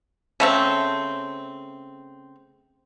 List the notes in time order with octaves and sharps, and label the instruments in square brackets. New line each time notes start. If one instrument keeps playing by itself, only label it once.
[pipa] C#3 A3 C4